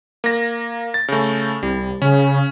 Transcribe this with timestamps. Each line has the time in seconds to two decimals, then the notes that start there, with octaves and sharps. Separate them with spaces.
0.24 A#3 A#6
0.94 A6
1.08 C#3 A3
1.63 C2 G3
2.02 C#3 C#4